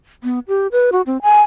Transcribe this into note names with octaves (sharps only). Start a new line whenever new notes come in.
B3
G4
B4
F#4
C4
G#5